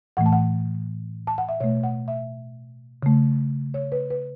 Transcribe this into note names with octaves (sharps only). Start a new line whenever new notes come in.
A2 E3 A3 F#5
A5
F#5
A5
F#5
E5
B2 A3 C#5
F#5
E5
C#3 A3
C#5
B4
B4